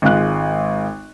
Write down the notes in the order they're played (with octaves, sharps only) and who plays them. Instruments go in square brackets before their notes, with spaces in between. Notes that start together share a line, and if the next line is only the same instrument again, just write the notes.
[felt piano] G#1 G#3 F4 F#6